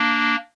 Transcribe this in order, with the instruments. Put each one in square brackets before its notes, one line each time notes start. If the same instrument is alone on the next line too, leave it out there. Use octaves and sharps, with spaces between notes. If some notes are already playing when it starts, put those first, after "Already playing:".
Already playing: [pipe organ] A#3 D4